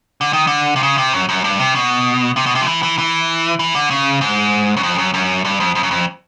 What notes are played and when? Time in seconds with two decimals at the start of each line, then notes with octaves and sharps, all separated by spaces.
0.21 D3
0.33 D#3
0.47 D3
0.76 C3
0.83 C#3
0.98 C3
1.13 F#2
1.29 F#2
1.44 G2
1.60 C3
1.75 B2
2.36 C3
2.46 B2
2.55 C3
2.62 F3
2.67 E3
2.83 E3
2.99 E3
3.59 E3
3.75 D3
3.91 C#3
4.21 G#2
4.77 F#2
4.83 F2
4.98 F#2
5.14 F#2
5.45 G2
5.60 F2
5.75 F2
5.83 F#2
5.91 F2